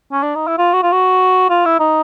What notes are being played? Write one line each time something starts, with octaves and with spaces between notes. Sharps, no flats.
C#4
D4
D#4
E4
F4
F#4
F4
F#4
F4
E4
D#4